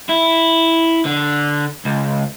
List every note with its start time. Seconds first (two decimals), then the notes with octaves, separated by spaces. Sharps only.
0.09 E4
1.05 D3
1.85 C#2